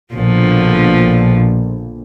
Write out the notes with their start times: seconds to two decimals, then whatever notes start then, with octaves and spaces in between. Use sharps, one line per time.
0.14 A#1 B2 D3 F3